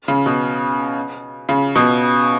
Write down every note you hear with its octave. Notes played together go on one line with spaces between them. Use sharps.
C#3
B2
C#3
B2